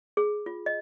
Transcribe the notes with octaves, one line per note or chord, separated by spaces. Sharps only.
G#4
F4
D#5